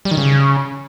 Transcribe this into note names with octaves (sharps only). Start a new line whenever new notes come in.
G3
D#3
C#3